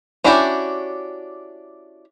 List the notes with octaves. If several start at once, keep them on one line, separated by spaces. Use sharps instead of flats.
C#4 D4 E4 F#4 G4